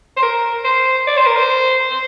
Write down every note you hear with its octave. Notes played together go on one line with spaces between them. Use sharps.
C5
A#4
C5
D5
C5
A#4
C5
C5